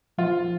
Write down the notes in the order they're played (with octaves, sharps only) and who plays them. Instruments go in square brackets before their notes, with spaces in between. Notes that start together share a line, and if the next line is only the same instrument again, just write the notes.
[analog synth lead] F3 [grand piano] F4